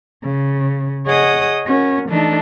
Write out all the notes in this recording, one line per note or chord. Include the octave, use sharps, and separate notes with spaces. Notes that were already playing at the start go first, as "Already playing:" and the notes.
C#3
G#4 C#5 D#5 F#5 D#6
C#4 F#4 A#4
E3 A3 D4 D#4